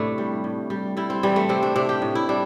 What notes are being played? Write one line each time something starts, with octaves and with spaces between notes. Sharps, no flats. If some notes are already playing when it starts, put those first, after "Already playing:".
Already playing: A2 C3 A3 C4 D4 E4
G3
A2
G3
G3 E4
C4
E3 G3
A3
C3 C4
D4
C3 D4
G4
A2
E4
G3 D4